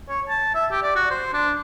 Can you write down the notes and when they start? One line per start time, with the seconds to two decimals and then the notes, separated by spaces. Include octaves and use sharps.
0.09 C#5
0.29 A5
0.54 E5
0.71 G4
0.82 D5
0.96 F#4
1.10 C5
1.33 D4